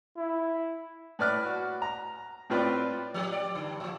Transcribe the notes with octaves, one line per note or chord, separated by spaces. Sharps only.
E4
A2 B4 D5 F6 F#6
F#4
A#5
A2 C4 F4 B4 C5 D5
F3 C#4 G4
D5
G2 D3
A2 F3